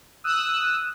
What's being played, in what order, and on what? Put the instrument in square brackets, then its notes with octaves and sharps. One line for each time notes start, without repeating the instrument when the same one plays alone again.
[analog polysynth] D#6 E6 F#6